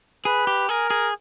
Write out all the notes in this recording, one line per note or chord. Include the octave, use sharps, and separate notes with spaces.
G#4 B4
G4
G#4 A#4
G#4